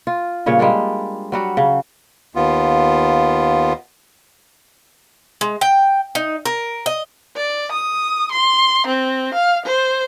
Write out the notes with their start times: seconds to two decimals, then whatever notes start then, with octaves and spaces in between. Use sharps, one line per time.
0.07 F4
0.46 G2 A#2 C#3 C#5
0.59 G3 G#3 A#3 D4
1.32 F#3 G3 F#4
1.57 C#3
2.36 D#2 B3 F4
5.41 G#3
5.61 G5
6.15 D#4
6.45 A#4
6.86 D#5
7.37 D5
7.72 D#6
8.31 C6
8.87 C4
9.34 F5
9.65 C5